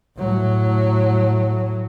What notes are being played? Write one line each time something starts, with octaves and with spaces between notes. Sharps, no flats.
A2 F#3